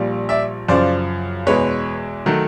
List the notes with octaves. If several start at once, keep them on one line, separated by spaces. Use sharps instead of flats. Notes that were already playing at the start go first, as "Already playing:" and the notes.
Already playing: A#1 A#2 G3
D5 E5
F#2 C#3 F3 C5 D5
E2 B2 G#3 B4 C#5
D#3 F#3 A3